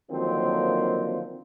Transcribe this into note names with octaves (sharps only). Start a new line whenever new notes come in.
D3 D#3 F3 F#3 A#3 C4